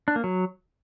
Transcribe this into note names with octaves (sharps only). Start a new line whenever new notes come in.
D4
A#3
F#3